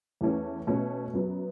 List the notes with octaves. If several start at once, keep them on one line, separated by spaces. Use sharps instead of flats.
E2 E3 A3 C#4
B2 A3 C#4
F#2 F#3 B3